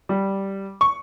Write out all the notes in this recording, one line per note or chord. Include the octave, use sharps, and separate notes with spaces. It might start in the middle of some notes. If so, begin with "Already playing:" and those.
G3
C#6